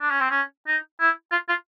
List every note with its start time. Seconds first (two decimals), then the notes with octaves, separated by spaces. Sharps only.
0.01 D4
0.11 C#4
0.21 C4
0.31 C#4
0.67 D#4
1.00 E4
1.32 F4
1.49 F4